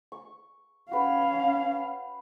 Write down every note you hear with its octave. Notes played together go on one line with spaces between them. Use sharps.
C#6
C#4 F#4 B4 F5 G5